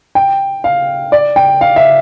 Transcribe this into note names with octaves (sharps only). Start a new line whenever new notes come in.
G5
F5
D5
G5
F5
E5